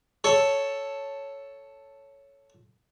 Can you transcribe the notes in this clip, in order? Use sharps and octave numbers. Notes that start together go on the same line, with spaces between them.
A4 C#5